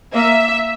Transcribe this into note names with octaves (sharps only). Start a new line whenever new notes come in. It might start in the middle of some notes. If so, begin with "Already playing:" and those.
A#3 E5